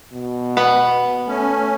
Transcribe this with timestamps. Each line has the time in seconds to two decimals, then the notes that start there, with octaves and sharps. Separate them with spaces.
0.12 B2
0.57 B3 B5
1.28 A3 C#4